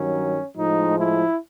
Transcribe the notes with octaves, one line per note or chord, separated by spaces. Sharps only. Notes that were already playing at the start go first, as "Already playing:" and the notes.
Already playing: G2 D#3 F#3 C#4
A2 F3 G#3 D#4
E4